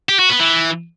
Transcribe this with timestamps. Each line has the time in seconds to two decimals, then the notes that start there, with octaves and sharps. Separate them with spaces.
0.09 G4
0.19 F#4
0.30 B3
0.40 E3